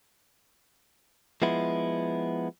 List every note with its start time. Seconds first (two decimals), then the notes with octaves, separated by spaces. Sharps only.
1.42 F3 G#3 B3 E4